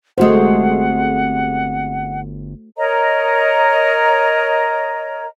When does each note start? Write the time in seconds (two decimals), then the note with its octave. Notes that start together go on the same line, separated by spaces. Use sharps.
0.18 G1 C3 G#3 A3 F#4 C5 F#5
2.76 A#4 C#5 D#5 A#5